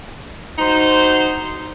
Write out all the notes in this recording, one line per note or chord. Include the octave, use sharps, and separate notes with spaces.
D#4 F#4 C5